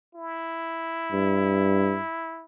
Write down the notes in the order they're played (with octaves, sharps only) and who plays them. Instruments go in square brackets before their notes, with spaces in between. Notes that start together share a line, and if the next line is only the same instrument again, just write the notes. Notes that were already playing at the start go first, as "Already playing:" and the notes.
[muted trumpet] E4
[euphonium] G2